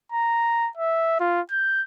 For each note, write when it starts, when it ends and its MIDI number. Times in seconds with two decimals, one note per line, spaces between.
0.12 0.70 82
0.77 1.18 76
1.20 1.41 65
1.51 1.82 91